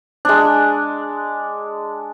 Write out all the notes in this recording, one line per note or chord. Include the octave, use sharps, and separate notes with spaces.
G#3 D4